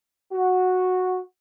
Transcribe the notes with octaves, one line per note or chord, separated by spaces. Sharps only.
F#4